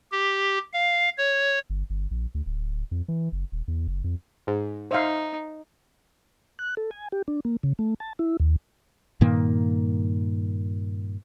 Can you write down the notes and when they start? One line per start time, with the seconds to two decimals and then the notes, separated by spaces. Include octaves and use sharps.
0.12 G4
0.73 F5
1.18 C#5
1.70 G1
1.90 G1
2.11 A#1
2.35 D2
2.46 D1
2.91 F2
3.08 E3
3.32 F#1
3.52 D#1
3.68 E2
3.88 F#1
4.04 F2
4.47 G#2
4.91 D#4 C5 E5 F5
6.59 F#6
6.77 A4
6.91 G#5
7.12 G4
7.28 D4
7.45 A#3
7.63 C#3
7.79 A3
8.00 A5
8.19 E4
8.40 D#2
9.21 G2 A#2 D#3 A#3